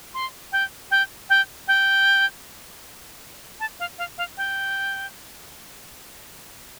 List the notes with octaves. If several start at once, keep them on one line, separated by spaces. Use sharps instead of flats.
C6
G5
G5
G5
G5
A5
F5
F5
F5
G5